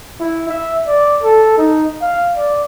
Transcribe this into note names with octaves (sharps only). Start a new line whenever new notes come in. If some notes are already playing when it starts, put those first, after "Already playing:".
E4
E5
D5
A4
D#4
F5
D5